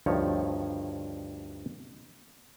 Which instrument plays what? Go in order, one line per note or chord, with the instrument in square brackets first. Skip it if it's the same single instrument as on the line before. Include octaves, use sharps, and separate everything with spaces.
[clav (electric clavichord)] D2 G2 D#3 F3 C#5